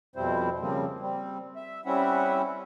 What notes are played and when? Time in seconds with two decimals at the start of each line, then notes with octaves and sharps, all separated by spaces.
0.16 F2 B2 G3 C4 E4 C5
0.60 C#3 F3 G3 A#3 C4
1.00 G3 C4
1.56 E5
1.85 G3 C4 C#4 E4 E5 F#5